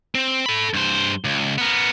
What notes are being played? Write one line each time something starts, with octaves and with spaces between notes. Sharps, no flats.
C4
A4 B5
G2 C5
C#2
B3 A#4